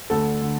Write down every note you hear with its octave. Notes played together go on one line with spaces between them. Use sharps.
D2 D3 A4
D3